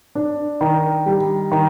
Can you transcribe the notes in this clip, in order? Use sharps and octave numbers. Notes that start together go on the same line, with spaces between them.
D4
D#3
G3
D#3